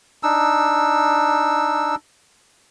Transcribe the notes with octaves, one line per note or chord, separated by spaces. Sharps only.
D4 D#4 E6